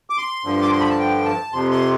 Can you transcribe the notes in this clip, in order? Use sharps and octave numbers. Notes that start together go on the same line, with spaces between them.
D6
C6
G2 D3 F3
D6
C6
B5
A5
G5
A5
F2 C3 F3 C6
C6